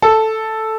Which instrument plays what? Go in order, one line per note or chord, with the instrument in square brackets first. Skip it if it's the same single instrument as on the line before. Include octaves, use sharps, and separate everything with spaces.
[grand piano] A4